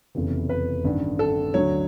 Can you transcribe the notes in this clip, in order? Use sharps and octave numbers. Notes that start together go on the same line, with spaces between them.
F1 E2 C#3 E3
B4
A1 G2 D#3
A4
D2 D3 F#3 C#5